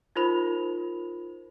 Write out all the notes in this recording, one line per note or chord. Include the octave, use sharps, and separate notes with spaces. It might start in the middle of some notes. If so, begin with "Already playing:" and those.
D#4 F4 A#4 C5 B5 F7